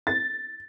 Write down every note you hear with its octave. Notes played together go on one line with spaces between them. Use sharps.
A6